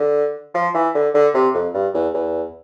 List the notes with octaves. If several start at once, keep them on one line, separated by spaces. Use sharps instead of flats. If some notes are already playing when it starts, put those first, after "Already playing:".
Already playing: D3
F3
E3
D3
D3
C3
F2
G2
E2
E2